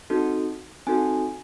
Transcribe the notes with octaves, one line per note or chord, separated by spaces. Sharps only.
C4 D#4 F#4 A4
C4 D#4 F#4 A4 G#5